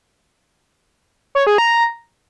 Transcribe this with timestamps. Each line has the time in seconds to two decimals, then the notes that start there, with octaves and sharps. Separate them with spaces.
1.35 C#5
1.47 G#4
1.58 A#5